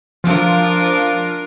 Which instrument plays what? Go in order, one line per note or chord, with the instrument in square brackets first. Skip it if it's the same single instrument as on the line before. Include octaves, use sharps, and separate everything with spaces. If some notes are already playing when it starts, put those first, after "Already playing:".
[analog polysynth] F3 [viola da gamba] D4 F4 A#4